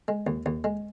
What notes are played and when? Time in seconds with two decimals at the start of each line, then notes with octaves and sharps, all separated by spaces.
0.08 G#3
0.27 D#2
0.46 D#2
0.64 G#3